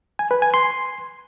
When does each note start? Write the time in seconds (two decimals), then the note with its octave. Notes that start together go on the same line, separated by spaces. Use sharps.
0.19 G#5
0.31 B4
0.42 G#5
0.54 C6